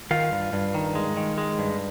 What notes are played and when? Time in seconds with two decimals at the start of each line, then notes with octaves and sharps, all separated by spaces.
0.11 D#3 F4 F5
0.32 G2
0.53 G2
0.74 D#3
0.95 G#3
1.17 D#3
1.38 G#3
1.59 G2